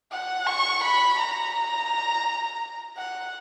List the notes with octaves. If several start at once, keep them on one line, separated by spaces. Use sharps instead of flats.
F#5
C#6
B5
A#5
F#5